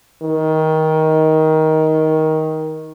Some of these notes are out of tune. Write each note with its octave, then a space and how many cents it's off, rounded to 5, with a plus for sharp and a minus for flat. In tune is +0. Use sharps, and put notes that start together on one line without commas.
D#3 +15